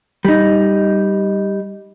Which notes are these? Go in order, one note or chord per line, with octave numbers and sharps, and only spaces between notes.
G3 D#4